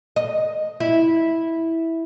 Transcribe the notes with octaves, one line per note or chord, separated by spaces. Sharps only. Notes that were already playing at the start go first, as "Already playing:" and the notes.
D#5
E4